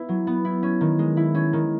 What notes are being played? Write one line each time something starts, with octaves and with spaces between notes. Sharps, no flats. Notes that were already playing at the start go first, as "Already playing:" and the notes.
Already playing: B3 E4
F#3
B3
E4
C#4
D#3
G#3
E4
C#4
D#3